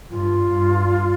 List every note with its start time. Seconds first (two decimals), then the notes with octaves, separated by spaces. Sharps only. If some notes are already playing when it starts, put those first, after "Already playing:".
0.11 G2 F4
0.52 G2